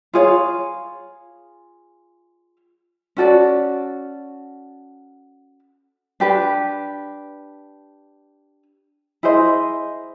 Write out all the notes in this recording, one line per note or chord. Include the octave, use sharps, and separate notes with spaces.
F4 G#4 C#5 F5
C#4 F#4 A4 D5
D4 G4 B4
E4 G#4 C5 D#5